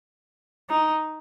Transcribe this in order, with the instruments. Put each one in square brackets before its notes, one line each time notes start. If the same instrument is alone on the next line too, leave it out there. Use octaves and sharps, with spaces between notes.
[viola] D#4